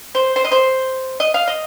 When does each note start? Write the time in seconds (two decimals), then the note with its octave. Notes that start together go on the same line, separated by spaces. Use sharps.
0.15 C5
0.36 C5
0.45 D#5
0.52 C5
1.20 D#5
1.34 F5
1.47 D#5